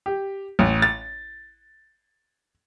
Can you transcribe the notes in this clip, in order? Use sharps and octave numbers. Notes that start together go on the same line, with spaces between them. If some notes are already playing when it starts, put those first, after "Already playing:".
G4
A1
A6